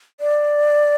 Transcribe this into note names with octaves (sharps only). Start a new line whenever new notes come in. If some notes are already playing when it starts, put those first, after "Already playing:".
D5